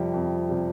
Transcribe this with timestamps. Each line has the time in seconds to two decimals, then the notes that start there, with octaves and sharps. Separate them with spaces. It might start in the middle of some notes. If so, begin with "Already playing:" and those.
Already playing: F2 C3 F3 G3
0.13 F2
0.49 C3 G3